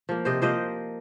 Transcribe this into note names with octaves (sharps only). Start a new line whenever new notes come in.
F3 A#3
C3 C5 D#5
F3 A#3 C5 D#5